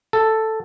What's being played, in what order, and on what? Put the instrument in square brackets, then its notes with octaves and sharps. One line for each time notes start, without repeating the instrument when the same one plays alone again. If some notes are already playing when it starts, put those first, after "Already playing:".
[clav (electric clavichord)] A4